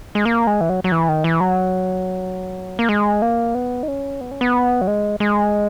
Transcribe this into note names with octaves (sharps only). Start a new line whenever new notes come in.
G#3
A#3
G#3
E3
F#3
F#3
E3
D#3
E3
F#3
A#3
G#3
A#3
B3
D#4
C#4
B3
C#4
B3
F#3
G#3
G#3